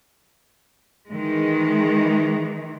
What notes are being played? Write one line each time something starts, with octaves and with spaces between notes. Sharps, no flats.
D#3 E3 G#3